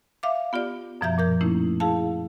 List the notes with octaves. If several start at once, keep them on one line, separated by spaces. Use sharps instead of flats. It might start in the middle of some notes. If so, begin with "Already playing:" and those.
E5 F5 D6
B3 F4 G4 D5
F#2 B2 F3 E5 A#5 G6
A#2 A#4 G6
A3 A#3 C#4 D#4 E4
E4 G#4 F5 A5